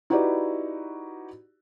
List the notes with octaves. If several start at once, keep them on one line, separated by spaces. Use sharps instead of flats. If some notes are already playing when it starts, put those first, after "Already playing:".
D#4 E4 F#4 G4 B4 D5